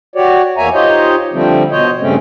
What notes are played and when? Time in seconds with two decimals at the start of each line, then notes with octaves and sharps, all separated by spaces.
0.16 F#4 G4 C#5 D5
0.58 E2 A#3 C#5 E5 G#5 A#5
0.74 D#4 F4 G4 C5 C#5 D#5
1.33 D3 F3 G3 A3 C4
1.71 B2 C5 C#5 D#5
2.01 G2 C#3 A3 C4 C#4